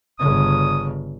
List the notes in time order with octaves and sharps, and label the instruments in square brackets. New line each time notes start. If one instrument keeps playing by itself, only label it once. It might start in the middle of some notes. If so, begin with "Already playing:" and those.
[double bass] G1 C#3 [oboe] D#6